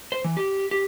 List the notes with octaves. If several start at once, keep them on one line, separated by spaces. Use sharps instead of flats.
C5
E3
G4
G4